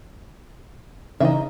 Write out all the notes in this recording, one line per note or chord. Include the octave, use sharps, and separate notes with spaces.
C#3 E3 D#4 D#5 E5